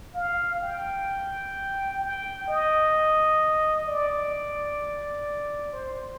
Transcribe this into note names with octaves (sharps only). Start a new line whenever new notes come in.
F5
G5
G5
D#5
D5
C5